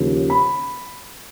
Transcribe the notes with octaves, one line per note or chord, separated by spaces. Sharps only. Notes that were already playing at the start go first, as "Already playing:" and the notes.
Already playing: D#2 C#3 F3
B5